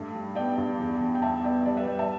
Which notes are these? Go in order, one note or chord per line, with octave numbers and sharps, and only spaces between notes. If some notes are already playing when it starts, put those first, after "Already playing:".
Already playing: G2 A3
G3
B3 D5 G5
G2
E2
E2
G5
E2 E5 A5
B3 D5 G5
G3 D5
B4 E5
G3 D5 G5
E5 A5